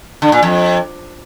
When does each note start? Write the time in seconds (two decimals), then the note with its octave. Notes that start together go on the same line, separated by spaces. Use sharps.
0.22 D3
0.32 A#2
0.43 F2